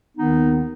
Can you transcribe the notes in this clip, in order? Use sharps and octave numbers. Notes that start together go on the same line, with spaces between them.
D#2 D#3 B3 D#4